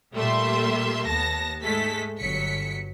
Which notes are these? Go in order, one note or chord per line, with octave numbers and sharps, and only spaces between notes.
A#2 G3 A3 A#3 E5 C6
D#2 B3 A5 A#6
G#2 G#3 A3 A4 B6
G1 F#3 B6 C#7